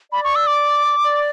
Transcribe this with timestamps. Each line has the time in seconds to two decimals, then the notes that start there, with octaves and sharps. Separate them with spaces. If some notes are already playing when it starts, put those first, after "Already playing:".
0.12 D5 B5
0.24 C#6
0.36 E6
0.47 D6
1.04 D5